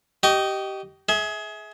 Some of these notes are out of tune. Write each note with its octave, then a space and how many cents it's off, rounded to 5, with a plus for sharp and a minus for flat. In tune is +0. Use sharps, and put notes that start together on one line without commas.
G4 -20 D#5 +0 C#6 +30
G#4 +20 E5 -25